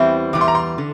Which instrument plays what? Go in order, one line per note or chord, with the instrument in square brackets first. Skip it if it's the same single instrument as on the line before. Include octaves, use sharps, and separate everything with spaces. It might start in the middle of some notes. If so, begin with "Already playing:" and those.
Already playing: [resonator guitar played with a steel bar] E2 E3 G3 C4 E4
[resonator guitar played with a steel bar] E2 E3 G3 [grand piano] D6
[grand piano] C6
A#5
C6
[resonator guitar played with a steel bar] D3